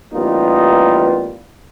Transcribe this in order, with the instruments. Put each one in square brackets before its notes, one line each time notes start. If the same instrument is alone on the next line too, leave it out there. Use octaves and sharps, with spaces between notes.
[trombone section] A1 G3 A#3 B3 D#4 F4